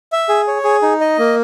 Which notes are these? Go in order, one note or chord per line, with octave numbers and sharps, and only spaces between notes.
E5
G#4
C#5
G#4
D#4
D#5
A#3